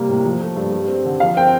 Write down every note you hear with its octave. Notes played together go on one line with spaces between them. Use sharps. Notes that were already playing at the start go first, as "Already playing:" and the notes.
Already playing: C3 G3 A#3
A2
F3
A3
G2
G3
C4
D3
F3 F5
C4 G5